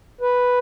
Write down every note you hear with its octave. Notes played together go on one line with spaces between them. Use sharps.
B4